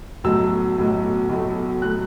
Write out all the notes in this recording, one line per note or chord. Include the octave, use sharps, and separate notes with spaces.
B1 A2 F#3 A3 E6
B1 A2 F#3 A3
B1 A2 F#3 A3
A2 F#3 A3 F#6